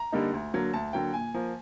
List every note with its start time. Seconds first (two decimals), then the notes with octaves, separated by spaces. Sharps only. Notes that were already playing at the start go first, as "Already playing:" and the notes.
Already playing: A#5
0.12 D3 G3 A#3 D#4
0.34 D2
0.54 D3 F#3 A#3
0.74 D2 A5
0.93 D3 F#3 A#3 G5
1.14 A#2 G#5
1.34 F3 A#3